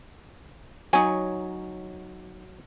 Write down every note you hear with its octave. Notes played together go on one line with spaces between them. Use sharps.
F#3 D#4 C#5 G#5